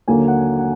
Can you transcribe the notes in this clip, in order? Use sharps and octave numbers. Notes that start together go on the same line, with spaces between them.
D#2 D3 F#3 A#3 G#5
F#5
F#5